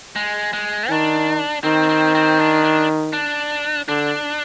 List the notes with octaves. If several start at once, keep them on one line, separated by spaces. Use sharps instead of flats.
G#3
G#3
D#3 D4
D#3 C4
C4
C4
D4
D4
D4
D3 D4